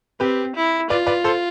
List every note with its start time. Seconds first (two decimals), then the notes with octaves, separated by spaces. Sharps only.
0.20 C4 G4 B4
0.56 E4
0.90 F4 B4 D5
1.06 B4 D5
1.24 A4 C5